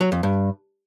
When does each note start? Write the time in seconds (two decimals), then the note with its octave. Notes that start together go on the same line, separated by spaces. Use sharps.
0.01 F#3
0.12 F2
0.23 G2